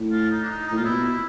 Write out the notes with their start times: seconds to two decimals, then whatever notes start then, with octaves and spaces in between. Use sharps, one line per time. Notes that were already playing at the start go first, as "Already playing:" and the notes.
Already playing: A2
0.11 F4
0.31 D#4
0.43 D4
0.48 D#4
0.67 A2 D#4
0.77 A#2 F4
0.85 B2 E4
1.04 E4